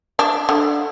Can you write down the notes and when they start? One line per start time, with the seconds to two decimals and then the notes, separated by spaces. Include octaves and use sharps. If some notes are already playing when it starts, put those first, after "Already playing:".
0.19 D4
0.49 D3